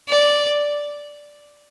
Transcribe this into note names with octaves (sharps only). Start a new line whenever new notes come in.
D5